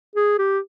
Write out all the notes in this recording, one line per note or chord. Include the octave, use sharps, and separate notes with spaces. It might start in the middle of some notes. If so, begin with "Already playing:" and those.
G#4
G4